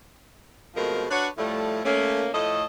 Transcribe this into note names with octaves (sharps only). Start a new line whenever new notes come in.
B2 F3 G#3 A3 C4 A#4
D4 F#4 B4 C#5
A2 F3 G3 A3
A3 A#3 C#4
A2 F3 A3 A4 D#5